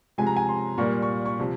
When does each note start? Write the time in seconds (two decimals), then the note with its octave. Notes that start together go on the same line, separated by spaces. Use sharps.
0.18 C3 F3 G#3 G#5
0.27 A#5
0.37 G#5
0.49 C6
0.78 A#2 G3 A#3 C#6
1.02 C#6
1.26 C#6
1.39 C3 F3